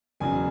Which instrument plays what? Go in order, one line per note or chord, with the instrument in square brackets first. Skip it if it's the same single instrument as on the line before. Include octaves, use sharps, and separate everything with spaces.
[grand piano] F#1 E2 C#3 F#3 G#5